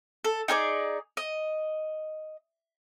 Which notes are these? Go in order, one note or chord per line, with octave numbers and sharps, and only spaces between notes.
A4
D#4 G#4 C#5 D5
D#5